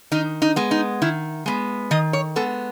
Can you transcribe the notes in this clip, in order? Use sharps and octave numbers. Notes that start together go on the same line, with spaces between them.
D#3 D#4
D#4
G#3 B3
D#4
D#3 E4
G#3 B3
D#3 D#5
C#5
G#3 B3 A4